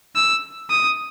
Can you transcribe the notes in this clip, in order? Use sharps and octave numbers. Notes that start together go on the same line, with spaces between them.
E6
D#6